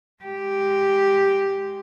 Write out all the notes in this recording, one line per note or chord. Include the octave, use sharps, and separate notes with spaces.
G#3 G4